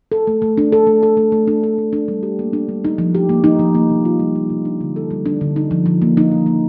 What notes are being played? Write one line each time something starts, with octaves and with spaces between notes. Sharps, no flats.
A4
A3
A3
D4
A4
A3
A4
A3
A3
D4
A4
A3
D4
G3
G4
A#3
D4
G3
D#4
F3
G4
A#3
D#4
F3
A#3
C3
F4
G3
A#3
C3
D4
D3
A4
G3
D4
D3
D#4
F3
F3
A#3
D#4
F3
A#3